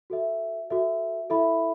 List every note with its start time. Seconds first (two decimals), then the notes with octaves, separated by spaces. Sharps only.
0.10 F#4 A4 E5
0.70 F#4 A4 E5
1.30 E4 A4 E5 B5